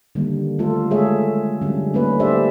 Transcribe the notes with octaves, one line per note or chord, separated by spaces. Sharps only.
D3 D#3 G3 A#3
A3 F4 A4
G#3 A3 G#4 C#5 E5
D3 F#3 G3 C#4
A3 A#3 C#4 D#4 B4
D4 G4 C5 D5 E5